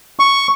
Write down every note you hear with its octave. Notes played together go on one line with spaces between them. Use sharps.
C#6